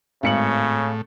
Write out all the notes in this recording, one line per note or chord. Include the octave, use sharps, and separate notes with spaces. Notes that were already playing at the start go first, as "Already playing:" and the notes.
G#1 A2 C#3 C#7 F#7